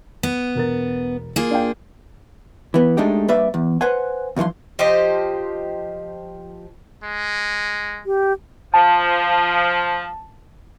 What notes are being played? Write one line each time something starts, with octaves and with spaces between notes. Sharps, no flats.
B3
E1 A#4 A6
A#3 F4 G#4
D4 F5 G5
E3 B3
G#3 A3 D4 D#4 G4
G2 A#3 B4 D5 E5
E2
B4 C5 F#5 G#5
D2 G2 E3 F3 C6
F3 G4 C5 D#5
G#3
G4
F3 A5